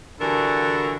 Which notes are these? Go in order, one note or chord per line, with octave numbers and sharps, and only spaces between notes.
D3 E3 G3 F#4 A4 A#4